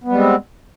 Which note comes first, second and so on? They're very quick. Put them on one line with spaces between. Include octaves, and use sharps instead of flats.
B3 G3 G#3 C4